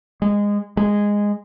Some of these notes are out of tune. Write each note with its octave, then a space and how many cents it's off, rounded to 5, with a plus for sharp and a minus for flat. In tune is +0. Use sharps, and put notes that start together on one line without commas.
G#3 -20
G#3 -10